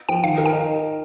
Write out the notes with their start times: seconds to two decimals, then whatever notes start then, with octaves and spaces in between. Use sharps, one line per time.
0.09 F3 G5
0.24 D#3 F5
0.38 A#4
0.46 G5
0.53 D#4